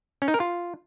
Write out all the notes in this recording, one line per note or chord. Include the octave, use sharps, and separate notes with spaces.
C#4
D#4
A#4
F4